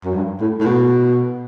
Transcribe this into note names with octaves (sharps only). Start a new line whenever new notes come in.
F#2
G2
A2
A2
B2